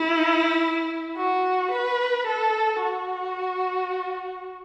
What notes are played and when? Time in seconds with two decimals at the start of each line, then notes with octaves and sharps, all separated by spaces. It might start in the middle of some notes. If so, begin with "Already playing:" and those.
Already playing: E4
1.17 F#4
1.71 B4
2.27 A4
2.82 F#4